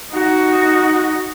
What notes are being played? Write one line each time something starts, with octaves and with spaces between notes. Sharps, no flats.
D#4 F#4